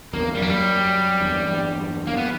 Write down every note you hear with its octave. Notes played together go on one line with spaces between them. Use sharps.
E2 G2 A#3
F#2 G3
A#3
G3
E2 G2
E2 G2 A#3
B3